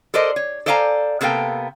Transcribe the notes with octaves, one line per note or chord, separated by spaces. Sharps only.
A4 A#4 C5 D5 D#5
C#5
A4 C5 D5 F5 G#5 A#5
C3 A#3 B3 A4 F5 G5